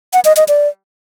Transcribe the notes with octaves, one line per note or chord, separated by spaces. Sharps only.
F#5
D#5
D#5
D5